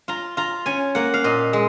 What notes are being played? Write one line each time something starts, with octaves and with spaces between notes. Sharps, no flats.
F4 A#5
F4 A#5
C#4 G#5
A#3 F#5
F5
A#2 D#5
G#3